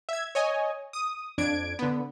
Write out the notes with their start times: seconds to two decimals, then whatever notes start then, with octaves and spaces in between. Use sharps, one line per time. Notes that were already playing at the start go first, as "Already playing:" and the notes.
0.09 E5 G#6
0.35 C#5 D#5 G#5
0.93 D#6
1.38 F2 D4 G#6 D7
1.79 D3 B3